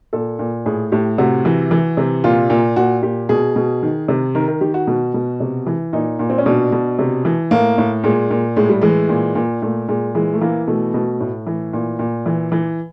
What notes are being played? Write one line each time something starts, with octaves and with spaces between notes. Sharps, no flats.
A#2 A4
A#2
A2 G#4
A2 G4
C3 F#4
E3
E3
C3
A#2 F4
A#2
A#2 F#4
A#2 G4
B2 G#4
B2
D#3
C3
D#3 A#4
A#4
D#3 G4
F#4
B2
B2
C3
E3
A#2 D#4
A#2
C4
C#4
B2 D4
B2
C3
E3
A2 A#3
A2
A#2 G#3
A#2
A2 G#3
G3
E3 G#3
A#2
A#2
A#2 A3
A#2 G#3
E3 G#3
A3
E3 A#3
B2 A3
B2
A2
E3
A#2
A#2
E3
E3